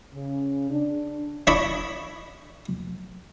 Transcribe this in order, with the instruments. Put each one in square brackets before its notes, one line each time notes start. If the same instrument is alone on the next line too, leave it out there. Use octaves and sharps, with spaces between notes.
[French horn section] C#3
D4
[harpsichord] D4 E4 D#5 B5 C#6